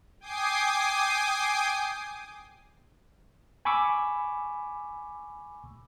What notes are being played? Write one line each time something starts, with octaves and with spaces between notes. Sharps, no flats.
G5 G#5 D6 D#6 C7
G#5 B5 C#6 D6 E6